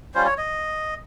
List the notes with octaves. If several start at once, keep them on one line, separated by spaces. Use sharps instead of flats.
G3 C#4 F4 C5
C#5
D#5